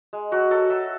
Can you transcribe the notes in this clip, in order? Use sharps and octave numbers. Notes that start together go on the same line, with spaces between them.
G#3
F#3 F#4
F#3 A4
F#3 E5